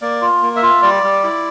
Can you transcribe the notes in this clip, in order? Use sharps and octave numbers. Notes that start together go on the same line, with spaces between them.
A#3 D5
F4
A#3
E5
F4
G3 D5
G3
E4